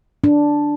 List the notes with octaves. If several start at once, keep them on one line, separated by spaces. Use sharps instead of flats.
D4